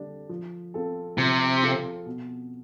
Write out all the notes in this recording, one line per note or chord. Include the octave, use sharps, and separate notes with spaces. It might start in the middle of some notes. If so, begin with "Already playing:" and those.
Already playing: D3 G3 D4
F3
C4 F4 A4
C3 F3
C4 F4 A4
B2